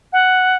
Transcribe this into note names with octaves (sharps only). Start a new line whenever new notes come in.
F#5